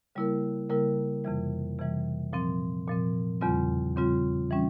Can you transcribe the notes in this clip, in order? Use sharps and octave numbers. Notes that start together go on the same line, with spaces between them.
C#3 G3 A#3 E4 A#4
C#3 G3 A#3 E4 A#4
F2 C3 E3 G3
F2 C3 E3 G3
A#2 F3 C4
A#2 F3 C4
E2 C#3 G3 C4 F4
E2 C#3 G3 C4 F4
E3 G3 C#4